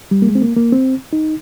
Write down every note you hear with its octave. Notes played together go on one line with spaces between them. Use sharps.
G3
A#3
G#3
C4
A#3
A#3
C4
D#4